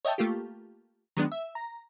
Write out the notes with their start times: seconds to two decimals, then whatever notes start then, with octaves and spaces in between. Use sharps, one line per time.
0.05 C#5 D#5 E5 G5 A5
0.18 A3 A#3 F4 G4
1.17 D#3 F#3 G#3 B3 D4
1.32 E5
1.55 A#5